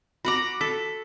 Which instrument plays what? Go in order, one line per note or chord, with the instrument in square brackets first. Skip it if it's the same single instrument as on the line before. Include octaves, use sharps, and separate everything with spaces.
[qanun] F#4 F#5 A#5 [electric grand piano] B5 D6
[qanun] A4 [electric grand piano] B6